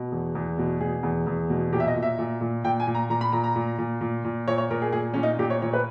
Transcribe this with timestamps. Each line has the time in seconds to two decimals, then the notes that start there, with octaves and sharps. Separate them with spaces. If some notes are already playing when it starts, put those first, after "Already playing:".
Already playing: B2
0.12 E2
0.35 E2
0.59 B2
0.80 B2 G#4
1.03 E2
1.27 E2
1.50 B2
1.72 A#2 G4
1.80 E5
1.87 D#5
1.96 A#2
2.03 E5
2.19 A#2
2.41 A#2
2.64 A#2 G5
2.80 G#5
2.87 A#2
2.95 A#5
3.10 A#2 A#5
3.21 B5
3.32 A#2 A#5
3.44 A#5
3.56 A#2
3.78 A#2
4.01 A#2
4.25 A#2
4.48 A#2 C#5
4.58 C#5
4.71 A#2 A#4
4.82 G#4
4.93 A#2 G#4
5.14 A#2 C#4
5.23 D#4
5.39 A#2 G4
5.50 C#5
5.62 A#2 C#5
5.73 B4